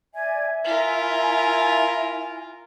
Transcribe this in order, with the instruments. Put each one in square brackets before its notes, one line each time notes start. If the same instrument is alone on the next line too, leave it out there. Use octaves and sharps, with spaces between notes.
[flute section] D5 G#5 G#6 [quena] E5
[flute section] E4 G#5 [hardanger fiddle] F4 A#4